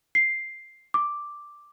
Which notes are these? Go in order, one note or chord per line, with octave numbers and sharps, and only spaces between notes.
C7
D6